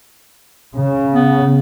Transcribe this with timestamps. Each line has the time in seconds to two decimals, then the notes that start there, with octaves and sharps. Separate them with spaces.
0.76 C#3
1.13 B3